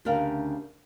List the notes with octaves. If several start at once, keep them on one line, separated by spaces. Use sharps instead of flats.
D2 C#3 D4 G4 A#4 F5